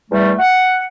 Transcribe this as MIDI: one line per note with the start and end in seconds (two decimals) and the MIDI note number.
0.10 0.32 40
0.10 0.32 55
0.10 0.32 57
0.39 0.81 78